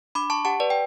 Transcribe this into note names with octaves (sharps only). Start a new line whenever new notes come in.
D4 B5 D6
A5 C#6
G4 F#5 A5
B4 D5
G5